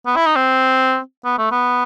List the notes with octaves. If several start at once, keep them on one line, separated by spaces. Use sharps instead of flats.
B3
E4
D#4
C4
B3
A3
B3